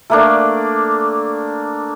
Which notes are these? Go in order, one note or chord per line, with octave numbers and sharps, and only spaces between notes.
A3 A#3 D4